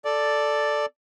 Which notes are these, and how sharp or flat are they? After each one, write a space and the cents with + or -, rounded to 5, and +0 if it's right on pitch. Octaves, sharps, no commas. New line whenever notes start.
A4 +0 D5 +0